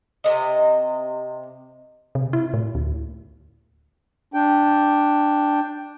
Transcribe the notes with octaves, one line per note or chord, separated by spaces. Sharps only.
C3 D#5
C3
E4
A2
D2
D4 G5